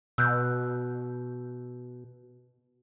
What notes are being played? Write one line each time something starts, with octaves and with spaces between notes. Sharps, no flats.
B2 E6 F#6 G6